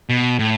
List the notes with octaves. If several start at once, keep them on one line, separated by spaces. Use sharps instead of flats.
B2
A2